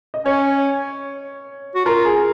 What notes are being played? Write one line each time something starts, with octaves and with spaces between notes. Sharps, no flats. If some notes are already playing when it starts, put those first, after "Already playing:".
D#5
C#4 C#5
F#4
F4 A#4
G#4